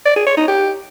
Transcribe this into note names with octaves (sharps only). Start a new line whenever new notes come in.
D5
G#4
C#5
D#4
G4